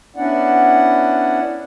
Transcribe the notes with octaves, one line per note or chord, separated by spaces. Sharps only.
B3 C#4 D4 E4 D5 F#5